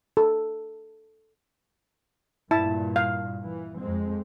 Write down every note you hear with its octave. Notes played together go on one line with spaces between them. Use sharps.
A4
G2 A#2 E4 A5
F5
E3
F2 G#3 C4